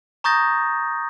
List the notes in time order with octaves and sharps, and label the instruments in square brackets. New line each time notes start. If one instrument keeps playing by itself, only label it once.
[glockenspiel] A#5 C#6 D#6 G6 A6 A#6